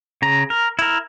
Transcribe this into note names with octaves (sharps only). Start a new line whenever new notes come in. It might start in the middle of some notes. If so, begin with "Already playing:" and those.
C#3 A#5
A#4
E4 A#4